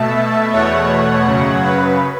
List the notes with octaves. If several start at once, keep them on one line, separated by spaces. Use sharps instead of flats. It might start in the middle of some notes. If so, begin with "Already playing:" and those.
Already playing: B2 A3 E5 A5
E2 B2 A3 C#5 F#5
F#2 C#3 F#3
B4